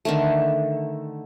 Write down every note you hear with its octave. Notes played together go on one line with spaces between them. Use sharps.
D3 D#3 A3